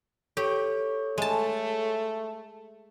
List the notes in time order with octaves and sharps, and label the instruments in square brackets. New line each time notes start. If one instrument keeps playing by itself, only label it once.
[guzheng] G4 [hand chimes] A4 C#5 C#6
[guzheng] G#3 A5 [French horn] A3